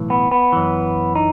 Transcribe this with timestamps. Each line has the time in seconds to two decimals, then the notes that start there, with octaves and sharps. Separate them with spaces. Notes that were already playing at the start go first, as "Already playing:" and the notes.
Already playing: B1 A2 E3
0.10 B3
0.31 B3
0.53 F#2 E3
1.15 D#4